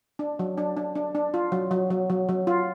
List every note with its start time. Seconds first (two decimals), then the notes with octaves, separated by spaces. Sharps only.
0.19 D4
0.39 F#3
0.58 D4
0.77 D4
0.95 D4
1.15 D4
1.34 F4
1.52 F#3
1.71 F#3
1.90 F#3
2.10 F#3
2.29 F#3
2.47 F4